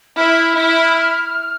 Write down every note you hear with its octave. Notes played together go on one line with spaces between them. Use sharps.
E4 F6
E4